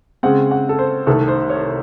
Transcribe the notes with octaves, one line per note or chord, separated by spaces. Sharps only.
C#3 G#3 C4 F#5
F#5
A4
C5
C2 C3 D#3 A3 A4
C5
C#5